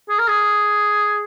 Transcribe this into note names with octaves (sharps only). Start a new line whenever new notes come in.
G#4
A#4
G#4